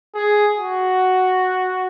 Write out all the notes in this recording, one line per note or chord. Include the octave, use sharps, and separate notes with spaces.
G#4
F#4